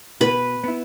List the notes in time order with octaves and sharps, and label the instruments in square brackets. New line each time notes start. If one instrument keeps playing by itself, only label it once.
[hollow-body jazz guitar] B2 [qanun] B4
[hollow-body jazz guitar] B3 E4